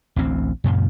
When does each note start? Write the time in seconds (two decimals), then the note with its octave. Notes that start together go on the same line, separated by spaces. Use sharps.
0.16 A1 D2 C4
0.64 F#2 A#2 C#3